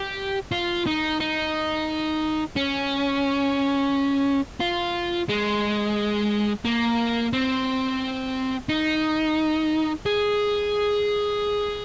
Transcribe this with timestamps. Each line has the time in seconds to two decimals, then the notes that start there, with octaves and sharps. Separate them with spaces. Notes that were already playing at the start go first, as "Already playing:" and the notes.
Already playing: G4
0.52 F4
0.87 D#4
1.20 D#4
2.56 C#4
4.60 F4
5.29 G#3
6.65 A#3
7.33 C4
8.69 D#4
10.06 G#4